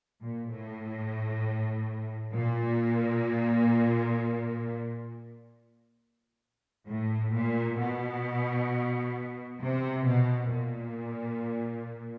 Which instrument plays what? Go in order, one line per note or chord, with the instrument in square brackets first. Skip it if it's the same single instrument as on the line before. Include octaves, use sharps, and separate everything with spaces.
[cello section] A#2
A2
A#2
A2
A#2
B2
C3
B2
A#2